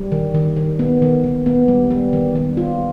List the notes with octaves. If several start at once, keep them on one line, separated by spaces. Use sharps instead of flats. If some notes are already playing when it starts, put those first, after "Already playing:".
Already playing: G3
D#3
D#3
D#3
B3
D#3
D#3
B3
G3
G3
D#3
G3
F4